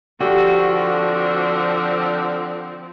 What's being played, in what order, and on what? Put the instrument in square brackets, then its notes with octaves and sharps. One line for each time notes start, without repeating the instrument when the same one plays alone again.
[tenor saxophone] D3 [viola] F3 C4 [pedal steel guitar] F#4 [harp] G4